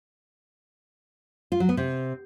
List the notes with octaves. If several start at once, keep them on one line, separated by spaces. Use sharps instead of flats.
F4
F#3
B3
C3